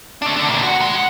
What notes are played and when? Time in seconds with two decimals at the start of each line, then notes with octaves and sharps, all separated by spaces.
0.22 A3 D4
0.36 D3 D4
0.48 A#2 D3
0.63 F#4 F#5
0.81 G#3
0.95 F#5